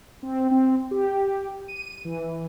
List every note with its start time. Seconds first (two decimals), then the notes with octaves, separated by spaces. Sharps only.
0.23 C4
0.51 C4
0.91 G4
1.68 D#7
2.05 E3